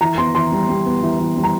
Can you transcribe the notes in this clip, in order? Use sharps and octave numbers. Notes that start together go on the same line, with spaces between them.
E3 A#5
B3 C6
E3 C6
G3
G3
B3
E3
E3
G3
A#5